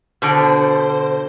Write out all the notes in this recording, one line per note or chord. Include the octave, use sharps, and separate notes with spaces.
B2 D3 C5